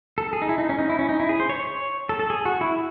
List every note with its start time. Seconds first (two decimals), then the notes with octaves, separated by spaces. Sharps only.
0.18 A4
0.33 G#4
0.42 D#4
0.49 E4
0.58 D#4
0.69 C#4
0.79 D#4
0.89 E4
0.99 C#4
1.09 D#4
1.20 E4
1.29 G#4
1.40 C5
1.49 C#5
1.60 C#5
2.09 A4
2.19 A4
2.30 G#4
2.45 F#4
2.61 E4